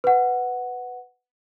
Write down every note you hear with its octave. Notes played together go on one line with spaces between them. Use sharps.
B4 F#5